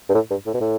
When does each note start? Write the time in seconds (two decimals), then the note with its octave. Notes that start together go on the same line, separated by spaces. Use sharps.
0.09 G2
0.15 A2
0.30 G2
0.46 A2
0.54 B2
0.61 A2